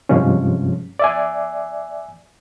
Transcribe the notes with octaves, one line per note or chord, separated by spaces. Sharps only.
G2 C3 F3 G#3 C#4
D5 E5 G#5